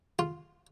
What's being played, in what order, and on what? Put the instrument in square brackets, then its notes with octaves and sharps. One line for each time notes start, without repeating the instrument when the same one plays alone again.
[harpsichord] F4